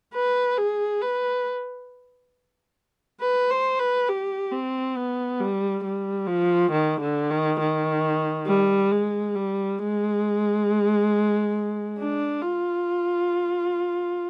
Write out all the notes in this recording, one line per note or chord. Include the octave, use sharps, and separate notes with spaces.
B4
G#4
B4
B4
C5
B4
G4
C4
B3
G3
G3
F3
D#3
D3
D#3
D#3
G3
G#3
G3
G#3
D4
F4